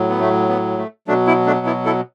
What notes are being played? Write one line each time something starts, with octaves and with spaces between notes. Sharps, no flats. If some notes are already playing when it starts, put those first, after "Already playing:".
Already playing: A2 F#3
B3
A3
B3
A3
B2 F#3 A3 D4
B3 E4
A3 D4
B3 E4
E4 A4